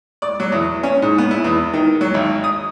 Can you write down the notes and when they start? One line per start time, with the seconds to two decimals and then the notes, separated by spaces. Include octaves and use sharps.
0.22 D5
0.40 F#3
0.52 E2
0.83 C#4
1.02 G#2
1.18 B3
1.31 E4
1.44 E2
1.74 D#3
2.01 F#3
2.14 G#1
2.44 D#6